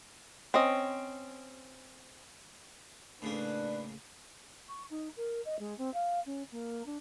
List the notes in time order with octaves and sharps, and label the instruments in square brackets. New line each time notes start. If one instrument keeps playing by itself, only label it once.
[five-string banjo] C4 C#4 D#5
[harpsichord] A2 C#3 A#3 [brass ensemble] D4 B4
[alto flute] C#6
D#4
A#4
D#5
G#3
C4
F5
C#4
A#3
D4